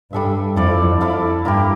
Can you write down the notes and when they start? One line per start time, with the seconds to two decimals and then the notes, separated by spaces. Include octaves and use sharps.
0.12 G2 G3 D4 A4 E5
0.56 F2 E4 A4 D5 F5
1.01 E4 A4 D5 F5
1.45 G2 A#3 E4 G4